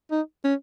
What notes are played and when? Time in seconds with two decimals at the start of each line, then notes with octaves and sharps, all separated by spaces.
0.11 D#4
0.44 C#4